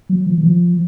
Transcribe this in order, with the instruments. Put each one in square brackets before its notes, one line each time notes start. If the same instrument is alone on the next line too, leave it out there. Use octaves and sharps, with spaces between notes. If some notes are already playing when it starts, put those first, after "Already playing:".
[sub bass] F#3
F3
E3
F3